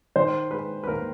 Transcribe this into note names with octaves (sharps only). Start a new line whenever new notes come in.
D#3 C5
G#3 B4
B4
D#2 A#4